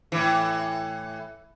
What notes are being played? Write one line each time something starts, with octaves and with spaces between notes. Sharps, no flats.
A2 E3